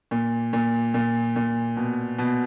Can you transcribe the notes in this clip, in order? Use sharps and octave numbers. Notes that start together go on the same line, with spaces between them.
A#2
A#2
A#2
A#2
B2
B2